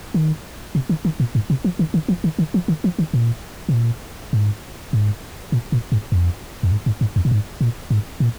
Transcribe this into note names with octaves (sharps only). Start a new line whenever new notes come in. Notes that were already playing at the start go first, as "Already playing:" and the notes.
D#3
C3
D#3
D#3
A#2
G#2
C3
F3
D#3
D#3
F3
D#3
D#3
F3
D#3
F3
D#3
A#2
C3
A#2
G#2
G#2
A#2
A#2
G#2
F2
F2
G#2
G#2
G#2
F2
A#2
G#2
A#2
G#2
A#2